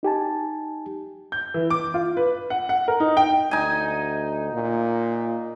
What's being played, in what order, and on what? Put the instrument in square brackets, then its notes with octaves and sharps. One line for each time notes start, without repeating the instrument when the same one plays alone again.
[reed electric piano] D#4 G4 G#5 A5
[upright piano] G6
E3
D6
F4
B4
F#5
F#5
A#4
D#4
G5
[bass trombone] D2 [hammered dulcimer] D#4 G#5
[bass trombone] A#2